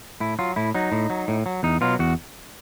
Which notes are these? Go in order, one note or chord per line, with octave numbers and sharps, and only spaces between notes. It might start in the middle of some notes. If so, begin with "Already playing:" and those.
A2 E4
F#3 F4
A2 E4
F#3 D#4
A2
F#3
A2
F#3
E2 D#4
B2 F#3 F4
E2 F#4